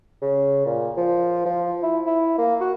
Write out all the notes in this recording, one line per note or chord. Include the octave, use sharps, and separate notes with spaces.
C#3
A#2
F3
F3
E4
E4
A#3
F#4